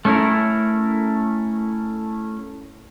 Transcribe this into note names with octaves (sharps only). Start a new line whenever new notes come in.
A3 C#4 D#4 E4 A#4